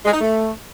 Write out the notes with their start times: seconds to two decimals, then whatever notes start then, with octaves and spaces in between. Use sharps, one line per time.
0.05 G#3
0.13 D#4
0.21 A3